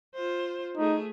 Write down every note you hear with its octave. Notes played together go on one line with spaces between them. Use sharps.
F4 C5
A3 D#4 G#4